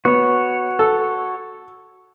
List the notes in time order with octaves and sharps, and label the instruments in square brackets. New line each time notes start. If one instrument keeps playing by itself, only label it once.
[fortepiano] B3 [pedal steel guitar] F#4 C#5
[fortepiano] A4